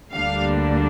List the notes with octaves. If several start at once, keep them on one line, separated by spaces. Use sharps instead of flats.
D2 D3 G3 A#3 D4 F5